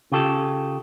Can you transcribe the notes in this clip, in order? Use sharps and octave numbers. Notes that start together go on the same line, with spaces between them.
C#3 F4 G4 A4